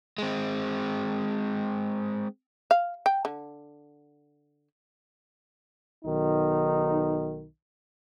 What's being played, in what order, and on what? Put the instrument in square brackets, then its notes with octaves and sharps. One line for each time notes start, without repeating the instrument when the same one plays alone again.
[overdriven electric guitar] G#3 C4
[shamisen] F5
G5
D3
[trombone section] B1 D#3 D#4